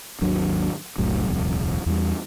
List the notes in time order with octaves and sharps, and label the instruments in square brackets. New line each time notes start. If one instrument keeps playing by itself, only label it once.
[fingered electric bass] G#1 D#2 F#3 D4
F1 C2 A2 F#3
D#1 C2 F2
E2 G3